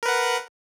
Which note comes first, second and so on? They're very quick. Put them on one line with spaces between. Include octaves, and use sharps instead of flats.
A#4 B4 F#5